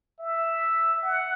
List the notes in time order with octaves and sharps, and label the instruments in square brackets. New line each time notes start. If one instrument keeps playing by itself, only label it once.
[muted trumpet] E5
F#5